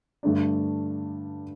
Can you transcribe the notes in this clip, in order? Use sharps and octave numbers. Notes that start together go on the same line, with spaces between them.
G2 D3 A3 D4